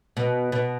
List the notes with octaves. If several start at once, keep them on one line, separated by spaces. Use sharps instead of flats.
B2
B2